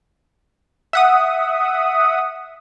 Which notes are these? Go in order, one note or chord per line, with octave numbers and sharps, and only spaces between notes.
E5 F#5 D#6